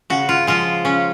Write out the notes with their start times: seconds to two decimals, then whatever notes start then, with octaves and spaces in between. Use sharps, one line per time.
0.10 C#3 F#4
0.29 F4
0.47 F3 G#3 F4
0.85 C#3 C#4